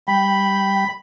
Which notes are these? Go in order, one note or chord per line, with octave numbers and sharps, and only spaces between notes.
G3 G5 B5